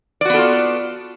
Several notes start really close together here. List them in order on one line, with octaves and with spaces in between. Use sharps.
D5 F#4 B3 A4 F4